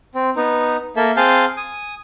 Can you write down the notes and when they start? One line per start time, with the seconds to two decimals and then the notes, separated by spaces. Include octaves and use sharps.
0.15 C4
0.36 B3 D#4
0.96 A#3 A4 E5
1.17 C4 G#4 F5 A5 G6
1.57 G#5 D#6